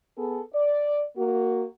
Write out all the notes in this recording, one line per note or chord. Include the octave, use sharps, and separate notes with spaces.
B3 G#4 A4
D5
A#3 F#4